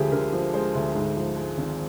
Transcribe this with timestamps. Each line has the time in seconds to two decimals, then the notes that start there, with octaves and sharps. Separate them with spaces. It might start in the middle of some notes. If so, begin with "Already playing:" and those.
Already playing: D2 D3 F3 G#3 G4 G#4
0.12 D3 A#4
0.33 F3
0.54 G#3 C5
0.75 D2
0.95 G#2
1.17 F3
1.37 G#3
1.58 G#1